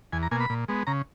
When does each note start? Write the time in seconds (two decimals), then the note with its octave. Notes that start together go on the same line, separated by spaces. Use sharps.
0.13 E2 G#5
0.23 A#5
0.31 B2 A#3 G#5
0.40 B5
0.50 A#2
0.68 G#3 B3
0.87 C#3 A#5